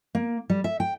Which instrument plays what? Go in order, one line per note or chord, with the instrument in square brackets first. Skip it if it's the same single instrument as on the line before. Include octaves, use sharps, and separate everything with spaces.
[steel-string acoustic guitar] A#3
G3
E5
G5